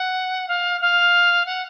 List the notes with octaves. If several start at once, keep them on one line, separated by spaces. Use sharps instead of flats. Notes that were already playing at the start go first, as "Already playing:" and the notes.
Already playing: F#5
F5
F5
F#5